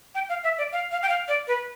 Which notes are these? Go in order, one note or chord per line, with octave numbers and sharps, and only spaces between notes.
G5
F5
E5
D5
F5
F5
G5
F5
D5
B4